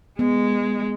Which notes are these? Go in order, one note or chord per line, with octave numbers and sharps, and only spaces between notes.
G#3 B3